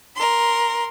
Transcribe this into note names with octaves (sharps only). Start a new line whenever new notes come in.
A#4 C6